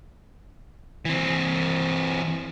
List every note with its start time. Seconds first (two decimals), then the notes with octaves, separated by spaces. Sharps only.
1.05 E3 C4